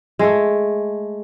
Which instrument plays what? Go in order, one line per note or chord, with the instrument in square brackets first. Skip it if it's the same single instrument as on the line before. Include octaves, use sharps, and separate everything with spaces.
[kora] G#3 A3